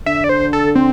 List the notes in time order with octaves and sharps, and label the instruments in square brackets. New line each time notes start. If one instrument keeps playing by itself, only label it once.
[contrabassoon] D3 [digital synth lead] E5
[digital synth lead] D5
C5
A4
C4